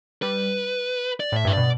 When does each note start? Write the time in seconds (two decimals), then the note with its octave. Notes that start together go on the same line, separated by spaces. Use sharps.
0.22 G3 B4
1.20 D5
1.32 A2 E5
1.45 G2 B4
1.53 B2 D5